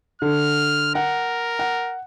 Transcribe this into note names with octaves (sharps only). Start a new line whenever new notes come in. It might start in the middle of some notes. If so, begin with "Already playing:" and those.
D3 F6
A#4 F#5
F#5